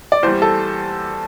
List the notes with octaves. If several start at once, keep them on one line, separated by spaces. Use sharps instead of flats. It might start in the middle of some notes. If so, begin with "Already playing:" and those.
D5
E2 E3 G3 C5
A4